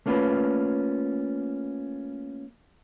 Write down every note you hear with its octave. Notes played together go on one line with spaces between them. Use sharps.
A3 A#3 C#4 F4 B4